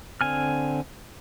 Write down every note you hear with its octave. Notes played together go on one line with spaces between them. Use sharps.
D3 C4 G#5 F6